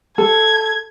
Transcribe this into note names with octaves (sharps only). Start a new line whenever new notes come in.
A4 G#6